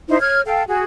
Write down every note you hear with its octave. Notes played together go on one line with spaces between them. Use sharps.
D#4 E4 C5
C#5 F6 G#6
A4 F5 G5
F#4 G#4